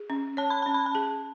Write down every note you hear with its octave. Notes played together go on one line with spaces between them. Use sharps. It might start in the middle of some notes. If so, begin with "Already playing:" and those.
Already playing: G#4
C#4
C#5 A5
B5
C#4 A5
B5
A5
G#4